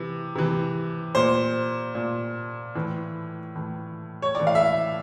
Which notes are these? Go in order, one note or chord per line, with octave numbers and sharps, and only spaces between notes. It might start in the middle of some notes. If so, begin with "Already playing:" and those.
Already playing: C3 E3
C3 E3
A#2 C5
A#2
A2 E3
A2 E3
C#5
A2 D5
E3
F5
E5